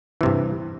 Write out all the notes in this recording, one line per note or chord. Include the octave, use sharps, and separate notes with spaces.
G2 C3 E3